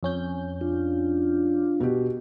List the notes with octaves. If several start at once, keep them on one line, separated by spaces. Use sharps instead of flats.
F2 C#4 G6
D4 F4
B2 G4